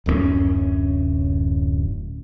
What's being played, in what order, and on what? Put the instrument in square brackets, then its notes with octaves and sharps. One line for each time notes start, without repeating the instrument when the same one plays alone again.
[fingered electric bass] D1 F#2 A3 C#4